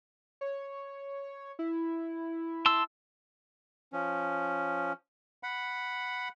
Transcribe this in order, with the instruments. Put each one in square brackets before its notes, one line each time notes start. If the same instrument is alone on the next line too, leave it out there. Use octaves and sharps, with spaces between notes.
[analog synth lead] C#5
E4
[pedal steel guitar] A5 C6 E6
[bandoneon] F3 C#4
F#5 B5